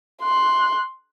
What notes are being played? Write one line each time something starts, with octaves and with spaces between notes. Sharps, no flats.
C6 F#6